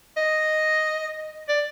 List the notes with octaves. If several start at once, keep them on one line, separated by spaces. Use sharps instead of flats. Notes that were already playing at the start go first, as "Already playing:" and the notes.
D#5
D5